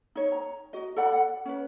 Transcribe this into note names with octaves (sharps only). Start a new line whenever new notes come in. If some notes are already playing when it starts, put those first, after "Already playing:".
D#4 C#5
A#5
F#4 D#5
A4 D5 F#5 B5
F#5
C#4 B4